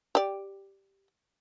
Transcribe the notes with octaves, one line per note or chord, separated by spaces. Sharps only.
G4 D5